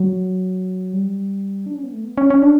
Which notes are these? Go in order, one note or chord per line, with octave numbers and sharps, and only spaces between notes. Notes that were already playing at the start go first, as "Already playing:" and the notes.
Already playing: F#3
G3
D4
C#4
B3
A3
B3
C#4
C#4
D4